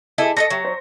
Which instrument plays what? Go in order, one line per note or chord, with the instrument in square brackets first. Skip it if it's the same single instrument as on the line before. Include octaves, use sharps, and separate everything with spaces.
[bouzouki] E4 A4 D#5 [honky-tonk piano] G#4 D6 B6
[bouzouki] D4 A4 D#5 [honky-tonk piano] C#6 A#6 C#7
[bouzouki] F#3 [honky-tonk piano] G4 E5
[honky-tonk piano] C5